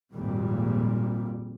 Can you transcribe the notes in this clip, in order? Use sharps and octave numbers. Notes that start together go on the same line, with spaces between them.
G#1 F2 A#2 G3